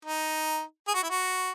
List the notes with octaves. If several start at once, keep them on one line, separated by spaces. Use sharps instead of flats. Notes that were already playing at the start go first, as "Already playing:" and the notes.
D#4
G#4
F#4
E4
F#4